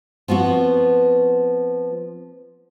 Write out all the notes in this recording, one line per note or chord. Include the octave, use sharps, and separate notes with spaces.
F3 B3 C4 F#4